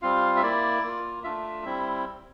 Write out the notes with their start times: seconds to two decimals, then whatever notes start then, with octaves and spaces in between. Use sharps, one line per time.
0.02 G3 C4 F4 F5
0.37 E5
0.42 A#3 E4 D5
0.83 A#3 F4
1.24 A3 D4 F4 E5
1.65 G3 C4 E4